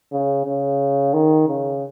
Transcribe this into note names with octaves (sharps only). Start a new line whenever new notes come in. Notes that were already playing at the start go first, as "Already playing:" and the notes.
C#3
C#3
D#3
C#3